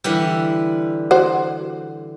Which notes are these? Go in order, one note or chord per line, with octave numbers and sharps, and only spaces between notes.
D3 E3 G3
F#4 C5